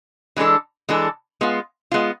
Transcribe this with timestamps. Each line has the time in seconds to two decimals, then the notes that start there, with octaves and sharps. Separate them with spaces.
0.36 E3 G#3 D4 A4
0.89 E3 G#3 D4 A4
1.41 G#3 B3 F4
1.92 G#3 B3 F4